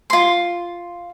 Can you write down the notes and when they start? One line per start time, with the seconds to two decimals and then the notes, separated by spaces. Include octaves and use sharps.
0.10 F4 C6